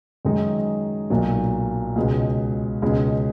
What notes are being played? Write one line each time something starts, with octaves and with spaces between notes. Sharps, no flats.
F#2 D#3 G#3 D#4
B1 A#2 F#3
C#2 B2 G#3 C#4
C#2 B2 G#3 C#4